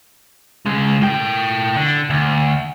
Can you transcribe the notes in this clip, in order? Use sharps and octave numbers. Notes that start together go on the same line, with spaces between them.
C#3 G#3
A2 G5
D3
D2